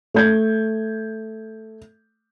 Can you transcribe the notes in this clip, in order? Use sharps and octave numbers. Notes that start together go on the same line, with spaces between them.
A3 G6 G#6